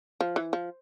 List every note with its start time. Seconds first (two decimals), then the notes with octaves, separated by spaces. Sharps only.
0.21 F3
0.36 E3
0.53 F3